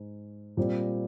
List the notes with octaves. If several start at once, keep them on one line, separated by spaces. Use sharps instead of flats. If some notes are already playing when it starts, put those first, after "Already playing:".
Already playing: G#2 G#3
A#2 G3 C4